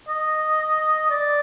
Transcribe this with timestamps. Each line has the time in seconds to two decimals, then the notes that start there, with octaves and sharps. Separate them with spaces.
0.09 D#5
1.10 D5